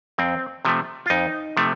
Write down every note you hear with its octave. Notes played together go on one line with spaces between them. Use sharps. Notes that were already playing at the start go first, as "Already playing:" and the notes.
F2 C4
C3 F3 A3
F4
F2 D#4
C3 F3 A3